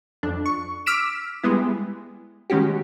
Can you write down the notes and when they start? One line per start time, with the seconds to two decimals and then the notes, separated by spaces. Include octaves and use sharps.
0.23 F2 D4
0.46 C#6
0.86 D6 E6 F6 B6 D7 E7
1.43 G3 G#3 B3 E4
2.50 D#3 G#3 C#4 F#4 G4